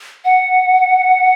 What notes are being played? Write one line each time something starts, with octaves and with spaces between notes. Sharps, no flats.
F#5